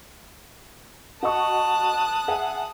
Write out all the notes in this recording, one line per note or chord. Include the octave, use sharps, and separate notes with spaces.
F#4 D#5 A5 C#6 D#6 F#6
G#4 E5 F#5